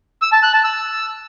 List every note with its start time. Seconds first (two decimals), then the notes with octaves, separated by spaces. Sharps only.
0.22 E6
0.32 A5
0.43 F#6
0.53 A5
0.64 E6